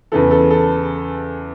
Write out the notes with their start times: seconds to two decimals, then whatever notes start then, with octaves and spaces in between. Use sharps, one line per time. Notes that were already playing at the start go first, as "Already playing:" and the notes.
0.12 E2 C#3 E3 A4
0.31 A4
0.50 A4